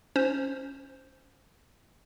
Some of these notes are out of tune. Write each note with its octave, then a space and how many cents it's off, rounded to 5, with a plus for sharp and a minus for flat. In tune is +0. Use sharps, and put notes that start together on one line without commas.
C#4 +0 C5 +0